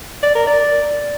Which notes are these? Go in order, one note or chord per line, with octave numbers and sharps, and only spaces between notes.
D5
A#4
D5